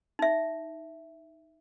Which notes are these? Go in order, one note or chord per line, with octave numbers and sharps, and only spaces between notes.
D#4 E5